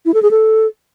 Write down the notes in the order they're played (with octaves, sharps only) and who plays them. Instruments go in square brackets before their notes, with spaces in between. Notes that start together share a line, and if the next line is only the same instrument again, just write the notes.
[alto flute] E4
A4
G#4
A4